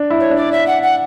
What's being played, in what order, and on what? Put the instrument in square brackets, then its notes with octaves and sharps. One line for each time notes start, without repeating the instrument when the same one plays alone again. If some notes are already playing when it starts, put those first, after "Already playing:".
Already playing: [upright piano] D4
E4
[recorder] C#5
[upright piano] D4
[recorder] D5
E5
F#5
F#5